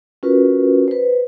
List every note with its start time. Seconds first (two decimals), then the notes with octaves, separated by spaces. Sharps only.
0.23 C#4 F4 F#4 A#4 B4
0.88 B4 C5